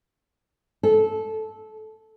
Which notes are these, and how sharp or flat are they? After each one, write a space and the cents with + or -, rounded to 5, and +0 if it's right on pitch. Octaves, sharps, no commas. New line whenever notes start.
A4 -15